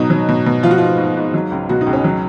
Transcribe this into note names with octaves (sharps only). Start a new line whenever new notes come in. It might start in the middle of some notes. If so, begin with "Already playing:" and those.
Already playing: B2 F#3 D#4
F#3
B2
B2
F3 F4
F#4
G#2 F4
G#2
G#2
F#3
C#2
B2 F#4
D#4
C#2
C#4
F#3